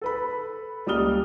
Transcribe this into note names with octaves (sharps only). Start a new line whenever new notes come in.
A4 B4 B5
C#2 G3 A#3 D#6 F6 G7